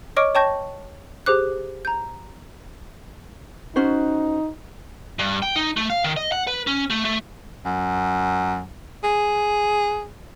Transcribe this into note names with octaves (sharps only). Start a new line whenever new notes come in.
C#5 D#5 C#6 D6 F6 D7
C#5 G5 A5 C#6 G6 A#6
G4 G#4 C5 D6 F#6
A#5 G6
C#4 D#4 F#4 C5
G2
G5
D#4
A3
F5
D#3
D#5
F#5
B4
C#4
A3
A3
F#2
G#4